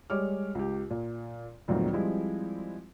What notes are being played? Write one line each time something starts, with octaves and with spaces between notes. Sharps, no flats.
G3 G#3 C#5 D6 F6
C#2 G4
A#2
D2 G2 A#2 D#3 F#3 C4
F3 G3 G#3 C4 E4